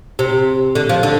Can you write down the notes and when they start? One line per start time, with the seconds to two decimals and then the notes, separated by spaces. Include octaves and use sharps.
0.19 C3
0.75 D3
0.89 F3
1.03 D3